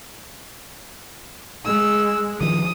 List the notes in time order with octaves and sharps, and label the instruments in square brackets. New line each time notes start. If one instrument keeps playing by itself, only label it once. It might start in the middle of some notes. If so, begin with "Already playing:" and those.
[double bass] G#3 [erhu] E6
[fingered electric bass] D#3 F3 [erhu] D#6